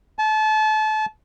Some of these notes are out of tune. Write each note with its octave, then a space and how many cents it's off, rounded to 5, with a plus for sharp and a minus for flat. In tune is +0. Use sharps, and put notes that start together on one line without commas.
A5 -30